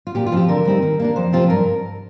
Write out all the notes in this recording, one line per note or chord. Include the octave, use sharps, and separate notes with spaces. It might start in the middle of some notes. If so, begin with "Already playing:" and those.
F4
A#2 G4
F4
F3 C4 G4
D3 A#4
G3 C4 D#4
D#3
A#3 D4 A#4
F2 C5
C3 F3 C4 F4
G2 A#4